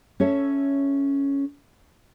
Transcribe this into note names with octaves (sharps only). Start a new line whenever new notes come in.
C#4 A4 C#5 E5